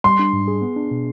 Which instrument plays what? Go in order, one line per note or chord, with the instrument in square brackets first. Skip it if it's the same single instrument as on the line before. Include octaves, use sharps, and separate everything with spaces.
[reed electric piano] G3 [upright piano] C6
[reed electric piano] D4
G#2
G#4
B3
D4
B2